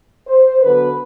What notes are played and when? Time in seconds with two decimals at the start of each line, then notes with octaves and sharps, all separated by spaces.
0.26 C5
0.62 D3 F#3 B3 B4